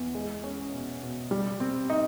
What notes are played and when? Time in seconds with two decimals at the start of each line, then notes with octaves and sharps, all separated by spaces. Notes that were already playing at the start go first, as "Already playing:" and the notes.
Already playing: E2
0.15 G#3
0.44 C#4
0.72 B2
1.01 B2
1.31 G3
1.60 C4
1.90 D#4